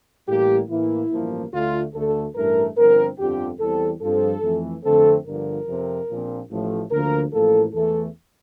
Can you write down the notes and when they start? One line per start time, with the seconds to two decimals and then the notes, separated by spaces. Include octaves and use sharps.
0.28 A1 A2 G3 A#3 G4
0.69 A2 E3 A#3 E4
1.11 A1 G2 F3 A#3
1.52 D2 D3 A3 F4
1.93 D2 D3 A3 A4
2.35 A1 G2 E3 A3 A#4
2.77 G1 G2 F3 C4 A#4
3.18 G1 F2 D3 F3 C4 G4
3.60 E2 E3 G3 C4 A4
4.01 G2 F3 C4 A4
4.43 F2 E3 A3
4.84 F2 D3 A3 C4 A4
5.25 G1 G2 D3 F3 A#4
5.66 F2 C3 F3 C4
6.08 A#1 A#2 F3 C4
6.49 A1 A2 F3 A3
6.91 D2 D3 F3 A#3 A#4
7.32 A1 A2 F3 A#3 A4
7.73 E2 E3 A3 A4